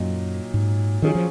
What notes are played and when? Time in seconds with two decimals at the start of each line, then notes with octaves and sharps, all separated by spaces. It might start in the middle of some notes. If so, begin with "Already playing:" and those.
Already playing: F#2 A#2 F#3 D#4
0.54 G#2
1.02 D#3 F#3 C#4 F4 G#4
1.15 F3